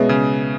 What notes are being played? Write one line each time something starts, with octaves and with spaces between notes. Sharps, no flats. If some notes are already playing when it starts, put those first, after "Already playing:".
Already playing: B2 G#3 C#4 G#4 B4 E5
C#3